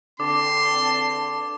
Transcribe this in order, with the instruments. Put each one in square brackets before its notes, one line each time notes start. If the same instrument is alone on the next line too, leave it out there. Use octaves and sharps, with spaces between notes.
[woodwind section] E2 C4 A5 [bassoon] D3 [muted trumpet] C6 [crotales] D6